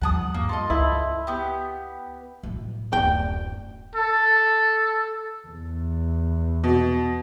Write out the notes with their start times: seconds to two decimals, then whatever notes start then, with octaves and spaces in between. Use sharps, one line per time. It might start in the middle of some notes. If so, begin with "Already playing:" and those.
0.02 D#2 F3 G3 F#5 A5 D#6
0.34 G2 A#3
0.49 F4 A4 D#5
0.70 C#2 E4
1.27 B3 G4
2.43 A2 F#3
2.93 D1 F#2 G5
3.95 A4
5.48 E2
6.64 B2